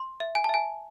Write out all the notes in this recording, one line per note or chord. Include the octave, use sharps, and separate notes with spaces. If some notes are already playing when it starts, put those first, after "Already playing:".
Already playing: C6
E5
G#5
A5
E5 G#5